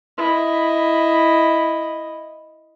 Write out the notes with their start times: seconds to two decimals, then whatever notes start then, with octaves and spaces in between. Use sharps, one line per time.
0.18 E4 D#5